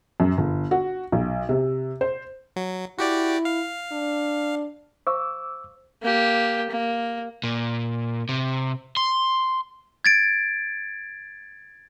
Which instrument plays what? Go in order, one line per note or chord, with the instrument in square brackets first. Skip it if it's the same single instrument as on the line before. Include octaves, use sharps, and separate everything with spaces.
[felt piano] F#2
G1
F#4
B1
C3
C5
[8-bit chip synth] F#3
[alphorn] E4 [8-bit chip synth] F#4 G4 D5
[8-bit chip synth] F5
[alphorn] D4
[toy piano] C5 F5 C#6 [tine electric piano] D6 E6
[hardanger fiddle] A#3 G4
A#3
[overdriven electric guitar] A#2
C3
C6
[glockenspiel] G#6 A6 D7